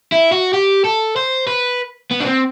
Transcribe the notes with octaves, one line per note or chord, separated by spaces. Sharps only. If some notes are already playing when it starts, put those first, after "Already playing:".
E4
F#4
G4
A4
C5
B4
B3
D4
C4